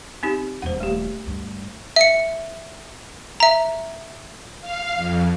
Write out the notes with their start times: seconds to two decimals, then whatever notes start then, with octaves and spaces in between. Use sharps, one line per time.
0.23 C4 D#4 G4
0.62 D#1 D#2 C5 F#5
0.80 A3 G4
1.26 D2 G2
1.96 E5 C#7
3.40 E5 A#5
4.61 F5
4.96 F2